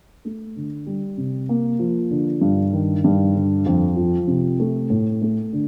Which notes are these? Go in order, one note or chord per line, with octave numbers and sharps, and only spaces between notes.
A3
D3
G3
C3
A#3
F3
D3
G2
D#3
G2
D3
F2
F3
C3
A3
A2
A3
D3